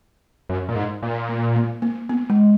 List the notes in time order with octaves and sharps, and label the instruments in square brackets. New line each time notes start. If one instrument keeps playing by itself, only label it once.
[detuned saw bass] F#2
A#2
G#2
A#2
[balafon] A#3
A#3
A#3
B3
G#3